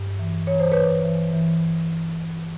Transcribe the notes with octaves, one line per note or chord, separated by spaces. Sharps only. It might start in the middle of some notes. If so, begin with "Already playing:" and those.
Already playing: G2
E3
E3 C#5
C5
E3 B4 C#5
E3
E3